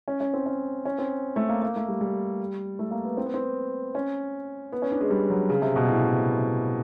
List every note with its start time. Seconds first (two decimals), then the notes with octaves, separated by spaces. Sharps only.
0.08 C#4
0.21 C#4
0.34 C4
0.46 C#4
0.85 C#4
0.99 C4
1.36 A3
1.49 A#3
1.62 A#3
1.76 A3
1.88 G3
2.01 G3
2.79 A3
2.91 A#3
3.05 B3
3.17 C4
3.26 B3
3.34 C4
3.95 C#4
4.73 B3
4.82 C#4
4.91 D4
5.01 G#3
5.11 G3
5.30 F#3
5.50 C#3
5.62 C3
5.76 B2
5.89 A2